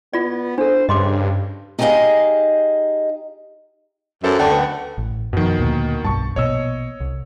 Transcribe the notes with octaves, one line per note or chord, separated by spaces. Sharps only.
B3 F4 D5
D4 A4 C5
G2 C#3 D#5 C6 D6
D#4 G4 G#4 B4 D#5 F5
F#2 A4 C5 E5
D2 D3 A3 F#5 G5
B3
A1
F#2 B2 D#3 F3
D2 A#2
B1 G2 A5 C#6
A#1 B2 C#5 D#5 E6
C2